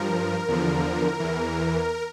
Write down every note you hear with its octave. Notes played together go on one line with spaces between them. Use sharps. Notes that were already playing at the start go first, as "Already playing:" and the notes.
Already playing: G2 F3 A#4
E2 D3 F3
E2 E3